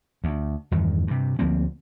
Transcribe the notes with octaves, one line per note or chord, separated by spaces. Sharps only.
D2
E2 G2 D#3
G2 C3
D2 F3 A#3 C4